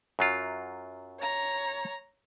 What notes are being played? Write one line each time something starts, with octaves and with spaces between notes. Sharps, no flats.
F#2 F#3 F4
C#5 A#5